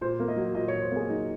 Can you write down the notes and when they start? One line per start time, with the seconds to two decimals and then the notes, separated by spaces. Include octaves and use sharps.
0.01 A#2 C5
0.20 A#3
0.28 D#5
0.37 F#3
0.55 A#2 D#5
0.68 A#2 C#5
0.82 C5
0.91 A#3 G#4
1.09 F#3 D#4